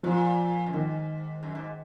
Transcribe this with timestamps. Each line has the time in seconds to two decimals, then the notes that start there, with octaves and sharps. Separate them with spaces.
0.03 A#2 F3
0.66 F#2
0.73 G#2 D#3
1.43 F#2
1.55 G#2